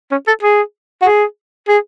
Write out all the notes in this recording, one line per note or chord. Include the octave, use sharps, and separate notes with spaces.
C#4
A4
G#4
F#4
G#4
G#4